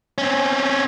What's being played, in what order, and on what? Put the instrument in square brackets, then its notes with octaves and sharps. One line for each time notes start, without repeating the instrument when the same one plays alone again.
[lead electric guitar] C4 C#4